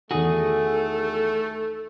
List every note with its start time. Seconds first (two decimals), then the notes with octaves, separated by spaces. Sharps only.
0.11 E2 D#3 A3 F#4 G#4 A4 D#6